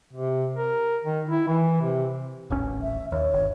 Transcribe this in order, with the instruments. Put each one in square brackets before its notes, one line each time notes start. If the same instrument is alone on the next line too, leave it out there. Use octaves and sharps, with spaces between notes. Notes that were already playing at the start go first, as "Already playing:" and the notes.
[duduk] C3
A#4
D#3
E4
E3
C3
[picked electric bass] D#1 A1 C#4
[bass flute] E5
[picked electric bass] D#2 [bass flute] C#5
[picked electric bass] G1